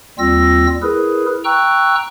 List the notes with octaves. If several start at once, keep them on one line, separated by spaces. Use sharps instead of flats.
D#2 G3 C4 F4 E6 A#6
E4 G#4 A#4 B4
G5 A#5 C#6 E6 F#6